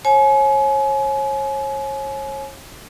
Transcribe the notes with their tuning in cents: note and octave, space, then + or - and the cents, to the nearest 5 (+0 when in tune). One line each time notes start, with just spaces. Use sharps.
C#5 -35 G#5 +35